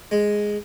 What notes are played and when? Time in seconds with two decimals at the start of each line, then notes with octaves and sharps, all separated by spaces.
0.11 G#3